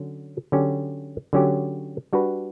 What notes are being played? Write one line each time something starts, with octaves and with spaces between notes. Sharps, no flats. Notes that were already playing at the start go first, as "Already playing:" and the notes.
Already playing: D3 F#3 C#4
D3 F#3 C#4 G4
D3 F#3 C#4 G4
G3 D4 F#4 B4